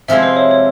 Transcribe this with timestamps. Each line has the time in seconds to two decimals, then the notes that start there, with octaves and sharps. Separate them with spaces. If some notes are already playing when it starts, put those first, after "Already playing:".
0.08 C3 F3 G#3 C4 E4 E5
0.23 C5
0.37 C#5
0.51 C#5